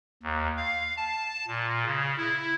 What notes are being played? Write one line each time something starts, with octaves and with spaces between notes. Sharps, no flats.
D#2
F5
A5
A#2
C#3
E4